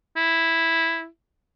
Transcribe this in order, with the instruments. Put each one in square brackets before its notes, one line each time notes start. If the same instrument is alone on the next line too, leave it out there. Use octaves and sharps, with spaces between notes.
[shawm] E4